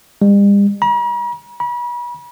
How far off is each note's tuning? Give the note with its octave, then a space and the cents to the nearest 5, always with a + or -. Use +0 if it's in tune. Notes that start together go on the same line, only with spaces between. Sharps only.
G3 +45
A#5 +45
B5 -40